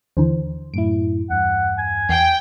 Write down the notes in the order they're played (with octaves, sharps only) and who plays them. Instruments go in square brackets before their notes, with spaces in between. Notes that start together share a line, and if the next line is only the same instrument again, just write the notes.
[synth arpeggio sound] D#2 D3 E3 [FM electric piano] C5
[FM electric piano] F#2 A2 E4 [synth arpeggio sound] D7
[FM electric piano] E2 G2 [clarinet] F#5
[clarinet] G#5
[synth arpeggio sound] E2 C7 [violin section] G5